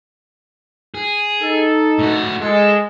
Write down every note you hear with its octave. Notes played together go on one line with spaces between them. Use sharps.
G#4
D#4 A4
A2 F#4
G#3 A4